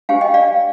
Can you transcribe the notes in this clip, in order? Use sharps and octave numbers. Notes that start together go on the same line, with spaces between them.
D4 G4 C5 F5 G#5
D#5 G5
D5 F5